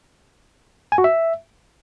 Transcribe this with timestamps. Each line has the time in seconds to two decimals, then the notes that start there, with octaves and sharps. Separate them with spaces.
0.92 G#5
0.98 F#4
1.04 E5